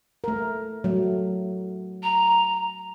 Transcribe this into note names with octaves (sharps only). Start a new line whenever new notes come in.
A3 A#4
F#3 A3
A#5